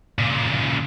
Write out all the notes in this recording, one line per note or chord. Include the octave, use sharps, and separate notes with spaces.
A#2 C#3